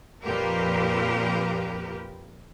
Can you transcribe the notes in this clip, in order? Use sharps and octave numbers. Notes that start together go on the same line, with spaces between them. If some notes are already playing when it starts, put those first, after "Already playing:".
F2 A#2 F3 G4 A#4 B4